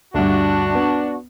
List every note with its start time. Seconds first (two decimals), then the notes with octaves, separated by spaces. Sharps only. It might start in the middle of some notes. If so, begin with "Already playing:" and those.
0.14 D2 G2 D4 F#4
0.75 B3